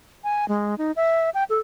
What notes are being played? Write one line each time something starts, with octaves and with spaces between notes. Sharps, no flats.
G#5
G#3
D#4
E5
G5
A4